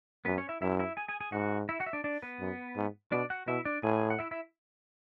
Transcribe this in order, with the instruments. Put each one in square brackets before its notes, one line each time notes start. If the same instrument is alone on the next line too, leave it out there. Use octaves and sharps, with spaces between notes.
[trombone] F#2 [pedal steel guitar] B3 B4
[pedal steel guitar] C#4 C#5
E4 E5
[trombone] F#2 [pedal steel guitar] E4 E5
[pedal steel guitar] E4 E5
G#4 G#5
G#4 G#5
G#4 G#5
[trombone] G#2 [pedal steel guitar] F#4 F#5
[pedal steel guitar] E4 E5
F#4 F#5
E5
D4 D5
D4 D5
B3 B4
[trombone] F#2
G#2
[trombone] B2 [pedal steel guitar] D4 D5
[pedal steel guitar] F#4 F#5
[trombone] B2 [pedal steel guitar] E4 E5
[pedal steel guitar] D4 D5
[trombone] A2 [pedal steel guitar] G#4 G#5
[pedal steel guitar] F#5
E4 E5
E4 E5